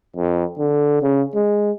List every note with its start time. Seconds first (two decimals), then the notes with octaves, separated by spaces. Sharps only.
0.16 F2
0.58 D3
1.02 C#3
1.35 G#3